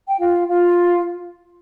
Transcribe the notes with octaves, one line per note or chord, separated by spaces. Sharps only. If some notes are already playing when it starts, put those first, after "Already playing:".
G5
F4 F5
F4 F5